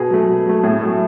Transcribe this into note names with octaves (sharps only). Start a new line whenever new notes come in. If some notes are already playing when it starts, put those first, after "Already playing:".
Already playing: B2 G#4
F#3 A3
B2
F#3 A3
A2 G#4
F#3 A3